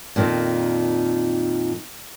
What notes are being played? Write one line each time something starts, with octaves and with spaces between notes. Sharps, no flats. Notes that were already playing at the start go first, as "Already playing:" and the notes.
F2 A#2 D3 D#3